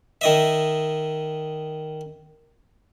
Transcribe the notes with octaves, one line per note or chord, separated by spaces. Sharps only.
D#3 D#5 E5